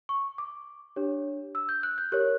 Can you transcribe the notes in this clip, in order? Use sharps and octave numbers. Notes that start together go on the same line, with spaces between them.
C#6
D6
D4 G4 C#5
E6
G6
F#6
G6
G4 A#4 C#5 F#6